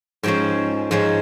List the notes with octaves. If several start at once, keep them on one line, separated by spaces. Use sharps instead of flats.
G#2 F3 G#3 C#4 G5
G#2 F3 G#3 C#4